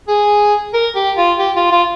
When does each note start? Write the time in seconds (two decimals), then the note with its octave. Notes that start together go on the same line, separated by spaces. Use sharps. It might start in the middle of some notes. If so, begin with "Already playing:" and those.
0.08 G#4
0.74 A#4
0.96 G4
1.17 F4
1.39 G4
1.56 F4
1.72 F4